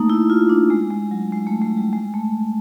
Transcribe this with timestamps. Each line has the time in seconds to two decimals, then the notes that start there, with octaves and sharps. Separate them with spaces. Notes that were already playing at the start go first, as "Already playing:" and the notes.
Already playing: A3 A#3 D#4
0.10 E4
0.30 F4
0.49 D4
0.70 G#3
0.90 G#3
1.11 F#3
1.32 G#3
1.47 A3
1.62 G#3
1.77 G3
1.93 G#3
2.14 A3